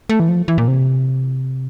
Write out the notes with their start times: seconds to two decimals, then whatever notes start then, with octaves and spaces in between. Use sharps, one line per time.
0.09 A3
0.20 E3
0.29 F3
0.48 E3
0.58 A#2
0.68 C3